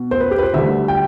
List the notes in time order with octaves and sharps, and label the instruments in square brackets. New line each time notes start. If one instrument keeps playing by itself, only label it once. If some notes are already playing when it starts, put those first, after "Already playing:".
Already playing: [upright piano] B2
C5
B4
G4
B4
C5
D2 D3 G3 E5
G5